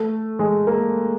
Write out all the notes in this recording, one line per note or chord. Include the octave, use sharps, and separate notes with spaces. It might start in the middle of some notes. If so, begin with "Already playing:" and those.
Already playing: A3
G#3
A#3